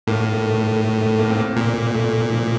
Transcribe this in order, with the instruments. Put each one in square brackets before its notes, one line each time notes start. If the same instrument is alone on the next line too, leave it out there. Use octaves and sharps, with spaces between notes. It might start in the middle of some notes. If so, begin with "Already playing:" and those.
[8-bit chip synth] A2 [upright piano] A#3
[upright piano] A3
A3
A3
A3
A#3
C4
A#3
[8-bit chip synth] A#2
[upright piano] A3
F3